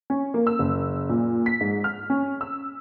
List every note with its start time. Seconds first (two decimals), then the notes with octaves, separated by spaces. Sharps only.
0.10 C#4
0.34 A#3
0.47 E6
0.59 F#1
1.09 A#2
1.46 B6
1.61 G#2
1.84 F6
2.10 C#4
2.41 E6